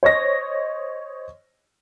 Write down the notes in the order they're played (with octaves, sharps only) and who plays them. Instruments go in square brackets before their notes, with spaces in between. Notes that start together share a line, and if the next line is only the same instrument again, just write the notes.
[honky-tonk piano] C5 C#5 D#5 A#6